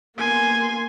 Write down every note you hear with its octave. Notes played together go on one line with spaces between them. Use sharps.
A#3 B3 G#5 C6